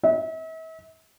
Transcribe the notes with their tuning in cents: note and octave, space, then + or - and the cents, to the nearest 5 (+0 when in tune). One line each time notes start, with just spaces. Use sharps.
E5 -40